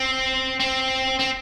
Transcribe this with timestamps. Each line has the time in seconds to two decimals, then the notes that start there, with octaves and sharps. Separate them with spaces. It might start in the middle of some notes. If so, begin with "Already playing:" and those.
Already playing: C4
0.60 C4
1.19 C4